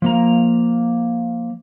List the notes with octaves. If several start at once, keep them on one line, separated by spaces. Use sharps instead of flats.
F3 A#3 A#5